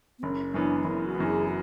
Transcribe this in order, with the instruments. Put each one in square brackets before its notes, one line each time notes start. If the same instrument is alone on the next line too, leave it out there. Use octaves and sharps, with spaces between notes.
[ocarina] B3
[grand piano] F#1 [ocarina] C#4
[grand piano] F#2 E3 B3 [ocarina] D4
[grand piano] F#1 [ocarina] E4
[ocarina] F#4
[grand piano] F#2 E3 B3
[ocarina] G#4
F#4